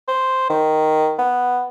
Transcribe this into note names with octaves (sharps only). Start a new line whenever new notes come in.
C5
D#3
B3